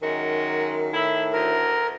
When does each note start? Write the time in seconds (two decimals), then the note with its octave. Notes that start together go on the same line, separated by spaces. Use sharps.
0.02 F#2 D#3 G#3 D#4 F#4
0.93 A2 E4
1.33 D2 A#4